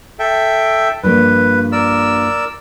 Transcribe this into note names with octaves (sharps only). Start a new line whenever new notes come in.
A4 E5 G5
G2 F3 A#3 B4
A#4 D5 E6